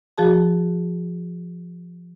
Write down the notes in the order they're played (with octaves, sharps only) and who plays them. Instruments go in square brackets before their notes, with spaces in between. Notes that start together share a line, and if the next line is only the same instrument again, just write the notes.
[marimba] F3 F#4 G#4 A5